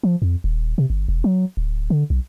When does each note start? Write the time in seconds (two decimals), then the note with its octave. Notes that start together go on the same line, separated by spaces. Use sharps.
0.03 F3
0.22 F2
0.44 D#1
0.78 C3
0.90 G1
1.08 E1
1.24 F#3
1.57 D1
1.90 D3
2.10 B1